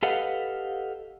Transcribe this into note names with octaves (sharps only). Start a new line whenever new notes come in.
G4 A4 B4 D#5 F5 F#5